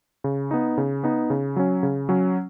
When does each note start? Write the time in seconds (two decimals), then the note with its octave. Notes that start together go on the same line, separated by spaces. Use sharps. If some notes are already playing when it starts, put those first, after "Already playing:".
0.24 C#3
0.51 B3 D#4
0.78 C#3
1.04 B3 D#4
1.30 C#3
1.56 F#3 C#4
1.83 C#3
2.09 F#3 C#4